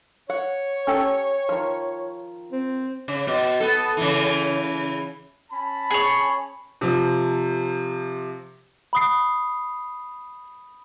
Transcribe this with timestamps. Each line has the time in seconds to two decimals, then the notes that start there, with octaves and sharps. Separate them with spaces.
0.30 C#5 F#5
0.87 C#4 G4 A4
1.49 D#3 F3
2.52 C4
3.08 C#3
3.27 B2
3.60 B3 A4
3.97 C#3 E3
5.51 C#4 A5 B5
5.90 G#4 C#5
6.81 C3 F3
8.93 B5 D#6 C7